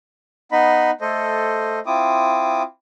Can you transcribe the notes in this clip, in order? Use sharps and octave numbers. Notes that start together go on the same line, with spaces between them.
B3 D#4 D#5 B5
A3 A4 C5 D#5
C4 E4 F4 D6 D#6